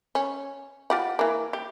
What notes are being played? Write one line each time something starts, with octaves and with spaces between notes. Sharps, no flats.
C#4
F4 G4 F#5
E3 A#3
G4